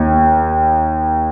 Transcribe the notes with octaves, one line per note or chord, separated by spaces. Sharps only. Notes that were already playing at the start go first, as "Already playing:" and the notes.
Already playing: D#2